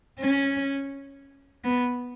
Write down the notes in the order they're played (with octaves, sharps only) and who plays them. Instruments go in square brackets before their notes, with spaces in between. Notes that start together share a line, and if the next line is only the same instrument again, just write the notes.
[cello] C#4
B3